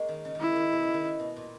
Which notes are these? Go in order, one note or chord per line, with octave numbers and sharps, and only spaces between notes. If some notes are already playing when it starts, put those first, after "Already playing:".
Already playing: G#3 A#3 C#4
D#3
C#3
D#3
C#3 E4
D#3
B2
C#3
D#3
C#3
B2
A#2